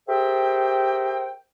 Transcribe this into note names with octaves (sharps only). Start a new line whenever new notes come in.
G4 G#4 A#4 C5 E5 G5